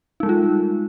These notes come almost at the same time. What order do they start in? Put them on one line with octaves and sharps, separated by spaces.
D#4 G#3 G3 F4